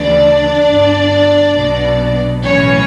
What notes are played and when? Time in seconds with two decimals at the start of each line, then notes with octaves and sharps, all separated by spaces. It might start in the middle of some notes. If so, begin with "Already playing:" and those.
Already playing: D2 C#3 E3 D4 D5
0.62 G1 G2 D3
1.53 B1 B2
2.42 B1 A2 E3 C#4 C#5